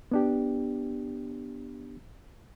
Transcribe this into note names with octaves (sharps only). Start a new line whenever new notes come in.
B3 D4 G4